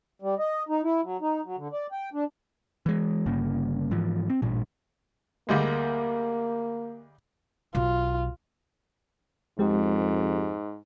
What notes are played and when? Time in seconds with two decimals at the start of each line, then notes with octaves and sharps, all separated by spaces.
0.22 G3
0.39 D#5
0.69 D#4
0.84 E4
1.03 F#3
1.21 D#4
1.45 F#3
1.57 D3
1.73 D5
1.92 G5
2.13 D4
2.86 E3 G#3
3.26 G1 G2 C#3 A#3
3.91 G#2 E3 F3
4.30 C4
4.42 A1 G2 A#2
5.49 D2 G3 G#3 A#3
7.75 B1 F4
9.59 F2 G#2 G#3 G4